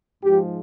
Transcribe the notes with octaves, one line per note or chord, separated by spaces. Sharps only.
G#2 F3 G#3 G4